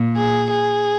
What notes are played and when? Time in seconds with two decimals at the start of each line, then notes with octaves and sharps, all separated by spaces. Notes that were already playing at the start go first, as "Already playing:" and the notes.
Already playing: A#2
0.16 G#4
0.49 G#4